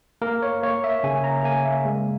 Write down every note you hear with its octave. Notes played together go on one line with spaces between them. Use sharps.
A#3 A#4
C#5
A#3 C#5
E5
C#3 G#5
A#5
A#3 G#5
E5
G#3